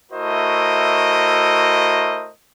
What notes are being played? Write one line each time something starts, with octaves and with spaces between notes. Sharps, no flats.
A3 E4 F#4 A#4 C5 D#5